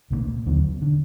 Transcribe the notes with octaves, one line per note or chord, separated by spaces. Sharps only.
C2 A#2 F3 A#3
D#2 D3 F#3 B3
D3